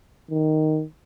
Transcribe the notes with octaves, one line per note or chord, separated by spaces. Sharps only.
D#3